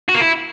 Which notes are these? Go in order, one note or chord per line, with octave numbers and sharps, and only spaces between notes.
F#4
A#3
E4